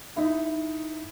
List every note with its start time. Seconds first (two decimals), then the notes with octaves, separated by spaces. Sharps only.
0.16 D#4 E4